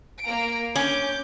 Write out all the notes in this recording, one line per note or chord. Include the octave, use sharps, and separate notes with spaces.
A#3 A#5 D7
C#4 D6 G6